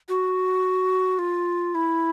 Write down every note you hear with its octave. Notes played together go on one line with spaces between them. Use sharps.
F#4
F4
E4